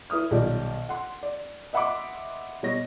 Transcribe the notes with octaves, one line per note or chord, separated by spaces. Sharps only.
E4 B4 D#6 F6
B1 D#3 G3 F4 G4 D5
F#5 C6
D5
D#5 E5 F#5 B5 C6 D6
B2 G3 C#5 D#5 A#6